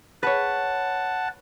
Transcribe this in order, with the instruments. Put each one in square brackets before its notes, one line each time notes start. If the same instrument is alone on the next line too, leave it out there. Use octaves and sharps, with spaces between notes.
[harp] B4 C#5 [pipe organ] F#5 A5